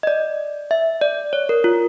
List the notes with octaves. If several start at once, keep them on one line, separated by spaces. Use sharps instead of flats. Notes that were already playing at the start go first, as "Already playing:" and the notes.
D#5
D5
E5
D5
C#5
A#4
F4